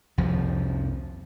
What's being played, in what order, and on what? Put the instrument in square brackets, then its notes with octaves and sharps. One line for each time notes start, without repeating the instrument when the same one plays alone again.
[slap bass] C2 F2 F3